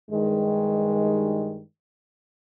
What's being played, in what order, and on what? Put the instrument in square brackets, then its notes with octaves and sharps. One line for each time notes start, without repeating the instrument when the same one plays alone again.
[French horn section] G2 D#3 G#3